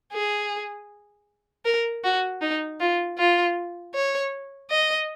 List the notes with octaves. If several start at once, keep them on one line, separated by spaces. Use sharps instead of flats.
G#4
A#4
F#4
D#4
F4
F4
C#5
D#5